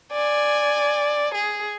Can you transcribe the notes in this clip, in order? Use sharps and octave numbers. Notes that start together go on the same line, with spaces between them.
D5 G#5
G#4